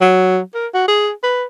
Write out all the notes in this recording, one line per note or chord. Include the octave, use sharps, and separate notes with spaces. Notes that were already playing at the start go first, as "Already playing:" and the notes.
F#3
A#4
F#4
G#4
B4